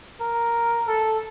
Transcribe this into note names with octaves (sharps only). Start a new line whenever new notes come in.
A#4
A4